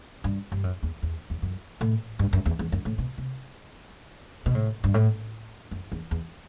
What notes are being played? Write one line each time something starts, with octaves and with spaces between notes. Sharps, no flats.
G2
G2
F#2
E2
E2
E2
F#2
A2
G2
F#2
E2
E2
F#2
A2
B2
C3
B2
A2
G2
A2
F#2
E2
E2